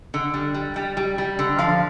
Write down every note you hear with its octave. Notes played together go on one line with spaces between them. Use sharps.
D3
G3
G3
G3
G3
G3
D3
F3 F5